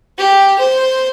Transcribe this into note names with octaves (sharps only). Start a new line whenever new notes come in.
G4
C5